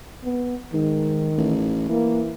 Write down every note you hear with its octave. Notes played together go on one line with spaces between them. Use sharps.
B3
G#2 D#3
A1
E3 A#3